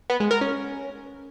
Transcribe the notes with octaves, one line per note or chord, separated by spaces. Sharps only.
B3
G#3
A#4
C#4